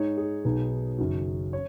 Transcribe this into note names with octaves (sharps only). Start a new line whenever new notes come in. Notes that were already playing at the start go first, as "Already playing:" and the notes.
Already playing: G#2 G#3 D#4 C#5
G#4
B1 B2 B3 D#4
F#1 F#2 D#3 F#3
C#5